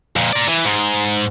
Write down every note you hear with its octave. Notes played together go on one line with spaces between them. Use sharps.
F2 A#2
A#4 D5
E3
G#2